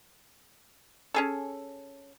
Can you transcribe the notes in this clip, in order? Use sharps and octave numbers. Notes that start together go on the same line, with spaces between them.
C#4 G#4 A4